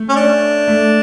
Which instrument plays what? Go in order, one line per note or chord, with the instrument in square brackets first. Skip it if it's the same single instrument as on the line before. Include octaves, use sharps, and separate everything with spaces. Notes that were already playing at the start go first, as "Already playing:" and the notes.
Already playing: [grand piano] A3
[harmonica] C#4
D4
[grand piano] A3